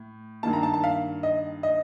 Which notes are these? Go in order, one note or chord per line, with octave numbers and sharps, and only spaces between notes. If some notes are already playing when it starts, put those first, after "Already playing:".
Already playing: A2
G2 D#3 A#3 A5
A#5
A5
A5
F5
D#5
D#5